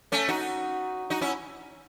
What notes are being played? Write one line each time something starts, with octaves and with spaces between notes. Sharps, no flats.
A3 C#4
D#4 F#4
D#4 F#4
C#4 E4